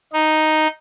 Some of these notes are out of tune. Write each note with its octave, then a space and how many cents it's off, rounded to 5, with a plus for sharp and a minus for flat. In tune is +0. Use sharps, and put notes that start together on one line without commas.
D#4 +0